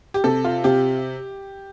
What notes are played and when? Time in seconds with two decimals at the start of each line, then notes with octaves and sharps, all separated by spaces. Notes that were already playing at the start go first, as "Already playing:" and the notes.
0.14 G4
0.24 C3 A4
0.44 F4
0.64 C3 G4